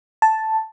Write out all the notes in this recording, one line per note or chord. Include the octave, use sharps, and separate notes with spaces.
A5